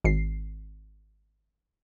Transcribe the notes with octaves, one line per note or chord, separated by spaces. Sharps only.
G#1 C7